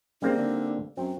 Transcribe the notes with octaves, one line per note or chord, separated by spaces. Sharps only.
C#3 G3 A#3 C4 D#4
D3
F#2 C4 F#4